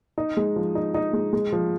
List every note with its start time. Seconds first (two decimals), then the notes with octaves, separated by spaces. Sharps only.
0.18 D#4
0.37 G#3
0.56 F3
0.75 D#4
0.94 D#4
1.13 G#3
1.33 G#3
1.52 F3